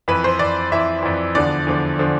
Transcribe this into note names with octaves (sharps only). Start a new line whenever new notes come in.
F2 E3 B4
C5
F2 E3 D5
F2 E3 E5
F2 E3
E2 D3 F3 D5
E2 D3 F3
D3 F3